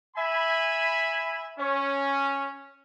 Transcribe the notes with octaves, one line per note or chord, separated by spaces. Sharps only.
E5 G#5 B5
C#4